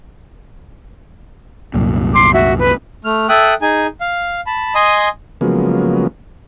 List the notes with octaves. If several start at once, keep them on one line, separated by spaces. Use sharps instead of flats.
C2 F#2 A#2
C6 D6
F#4 E5
B4
A3 F6
A4 E5 G5 D#6 F#6
D#4 G#4 G#5
F5
A5 B5
D#5 G#5 C6 D#6
C#3 F3 F#3 G#3 A#3 B3